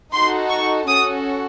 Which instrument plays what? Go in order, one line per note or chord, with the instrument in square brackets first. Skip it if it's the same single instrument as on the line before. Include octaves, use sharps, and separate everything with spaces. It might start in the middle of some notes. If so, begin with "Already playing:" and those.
[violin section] D#4 F#4 A4 C6
C#6
C#4 F#4 A4 D#6